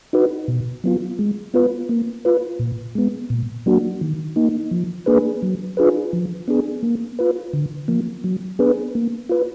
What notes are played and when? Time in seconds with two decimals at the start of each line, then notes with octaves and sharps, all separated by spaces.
0.13 D#4 F#4 B4
0.48 B2
0.84 F#3 B3 F4
1.19 G#3
1.54 B3 F4 B4
1.89 A#3
2.25 F4 B4
2.59 A#2
2.95 G#3 B3
3.30 A#2
3.66 F#3 A#3 D4 F#4
4.01 D#3
4.36 A#3 D#4
4.71 F3
5.06 A#3 D4 G#4 B4
5.42 F#3
5.77 D4 F4 G#4 B4
6.13 F3
6.48 B3 D4 G#4
6.83 A#3
7.19 F4 B4
7.53 D3
7.88 F3 A#3
8.24 F#3
8.59 B3 D4 G#4 B4
8.95 A#3
9.29 F4 B4